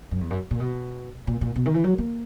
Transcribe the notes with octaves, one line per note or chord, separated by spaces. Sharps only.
F#2
E2
F#2
A#2
B2
A#2
A#2
B2
D#3
E3
F#3
A#3